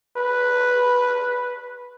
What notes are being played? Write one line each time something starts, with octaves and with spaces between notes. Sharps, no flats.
B4